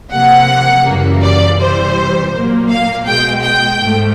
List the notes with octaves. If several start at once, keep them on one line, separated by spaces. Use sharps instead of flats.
C3 F3 A#3 F#5
F#2 C#3 E3 G3 A#3
D5
C3 E3 G3 C5
A#2 F#3 A#3
F5
B2 G#3 G5
G5
G#2 F3 A3